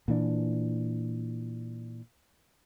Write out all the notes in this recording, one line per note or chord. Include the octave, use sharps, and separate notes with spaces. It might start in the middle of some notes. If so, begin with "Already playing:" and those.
A#2 E3 D4